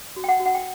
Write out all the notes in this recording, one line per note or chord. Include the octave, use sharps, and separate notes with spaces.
F#4
G5
F#5
F#4
F#5
G5